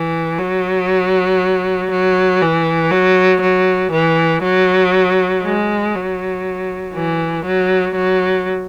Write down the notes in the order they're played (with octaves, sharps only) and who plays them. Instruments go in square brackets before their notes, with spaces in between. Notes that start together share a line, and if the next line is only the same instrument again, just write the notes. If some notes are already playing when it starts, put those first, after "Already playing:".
Already playing: [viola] E3
F#3
F#3
E3
F#3
F#3
E3
F#3
G#3
F#3
E3
F#3
F#3